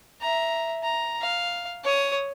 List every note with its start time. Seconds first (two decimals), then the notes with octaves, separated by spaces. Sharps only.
0.21 E5 A#5
0.83 A#5
1.21 F5
1.84 C#5 D#6